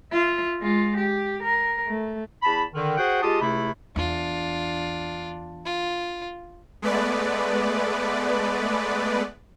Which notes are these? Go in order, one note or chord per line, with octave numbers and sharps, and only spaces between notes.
F4 E5
G#3 F4
G4
A#4
A3
E2 A5 B5
D3 D#3
F#4 G#4 C5 F#5 G5
G#3 F4 G4 A5 D#6
C#2 C3 A3 E4 B5
E2 D4 F4
F4
G#3 A3 B3 B4 D5